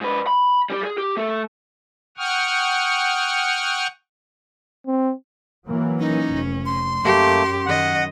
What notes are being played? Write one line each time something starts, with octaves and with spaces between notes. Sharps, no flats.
G#2 B4
B5
G3 G4
G#4
G4
A3 A4
F#5 G5 C#6 D#6 F6
C4
E3 F#3 A#3
C#4 D#4
F1
C6
F#2 A3 A#3 G4
D#3 D#5 F#5